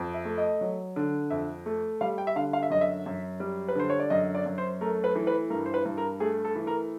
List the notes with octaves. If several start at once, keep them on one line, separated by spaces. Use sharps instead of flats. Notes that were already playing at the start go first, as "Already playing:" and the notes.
Already playing: F2
E5
A3
D#5
F#3
D3
F2 E5
A3
G3 F5
G5
E5
D3 F5
F5
E5
F#2 D#5
E5
F#2
G3
B4
D3 C5
C#5
D5
F#2 D#5
D5
F#2
C5
A3 A#4
B4
E3
B4
G2 A#4
C5
B4
G2
A#4
A3 G#4
A4
E3
A#4